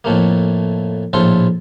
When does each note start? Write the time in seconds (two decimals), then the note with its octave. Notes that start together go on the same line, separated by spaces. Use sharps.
0.04 F2 A2 A3 A#3
1.13 A#1 A2 F4 A4 C5